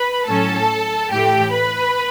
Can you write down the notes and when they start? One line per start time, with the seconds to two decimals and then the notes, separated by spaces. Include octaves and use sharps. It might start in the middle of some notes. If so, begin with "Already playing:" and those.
Already playing: B4 B5
0.26 A2 F#3 C#4 A4 A5
1.11 A2 E3 A3 G4 G5
1.52 B4 B5